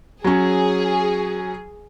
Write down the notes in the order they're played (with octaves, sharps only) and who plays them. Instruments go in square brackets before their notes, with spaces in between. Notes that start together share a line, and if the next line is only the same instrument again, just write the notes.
[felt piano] F#3 C#4 [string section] G#4